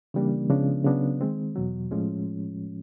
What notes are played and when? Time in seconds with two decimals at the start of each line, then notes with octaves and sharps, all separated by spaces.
0.14 C#3 E3 G3 A#3 D4
0.50 C#3 F3 G#3 B3 D4
0.85 C#3 F#3 B3 D4
1.21 D#3 G#3 C4
1.56 E2 B2 F#3
1.91 A2 F3 G#3 C#4